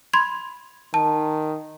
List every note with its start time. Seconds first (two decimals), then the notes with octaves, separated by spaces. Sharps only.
0.13 B5 C6 G#6
0.94 D#3 A5